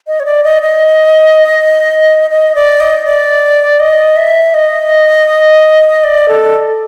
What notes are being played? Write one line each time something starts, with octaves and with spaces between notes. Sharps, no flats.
D#5
C#5
D5
D#5
D#5
D#5
D5
D#5
D5
D#5
E5
D#5
D5
A4